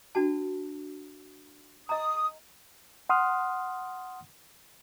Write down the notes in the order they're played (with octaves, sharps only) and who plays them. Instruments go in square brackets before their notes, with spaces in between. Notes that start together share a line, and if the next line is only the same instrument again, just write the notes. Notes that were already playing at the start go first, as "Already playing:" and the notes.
[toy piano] D4 F#4 A5
[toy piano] D#5 A#5 [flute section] D#6
[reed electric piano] F#5 C6 D#6 F6